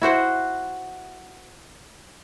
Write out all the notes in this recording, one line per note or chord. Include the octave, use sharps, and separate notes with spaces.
E4 F#4 C5 F#5